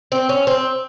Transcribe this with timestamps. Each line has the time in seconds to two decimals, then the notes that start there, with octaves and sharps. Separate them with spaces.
0.12 C4
0.29 C#4
0.47 C4